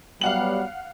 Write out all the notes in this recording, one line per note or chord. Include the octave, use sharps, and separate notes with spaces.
F#3 G3 B3 F5 F#5 F#7